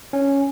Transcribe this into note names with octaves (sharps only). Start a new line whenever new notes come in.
C#4